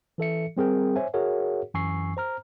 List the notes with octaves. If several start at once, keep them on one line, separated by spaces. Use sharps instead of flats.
E3 A4 E5 C#7
G3 C4 G#4 A#4 G5
C5 C#5 E5 G#5
F#4 G#4 A#4 C#5 E5 F#5
F#2 E3 G#5 C#6 E6 C7
C5 A#5 F6